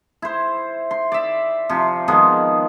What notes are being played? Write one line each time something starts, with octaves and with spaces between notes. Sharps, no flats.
E4 C5
C6
D5 E5
C3 F3
D#3 F3 G#3 B3